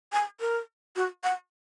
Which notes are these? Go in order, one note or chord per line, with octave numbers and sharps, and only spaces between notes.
G#5
A#4
F#4
F#5